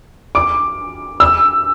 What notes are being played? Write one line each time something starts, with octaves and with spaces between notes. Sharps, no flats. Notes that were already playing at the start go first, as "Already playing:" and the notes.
D6
E6